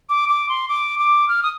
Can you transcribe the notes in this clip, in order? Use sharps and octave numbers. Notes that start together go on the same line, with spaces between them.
D6
D6
C6
D6
D6
F6
D#6